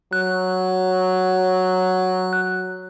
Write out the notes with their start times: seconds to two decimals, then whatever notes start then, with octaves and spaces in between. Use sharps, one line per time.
0.13 F#3 F#6